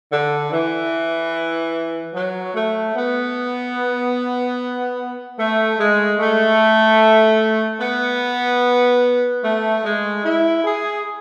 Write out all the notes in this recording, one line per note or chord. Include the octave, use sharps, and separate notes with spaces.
D3
E3
F#3
A3
B3
A3
G#3
A3
B3
A3
G#3
E4
G#4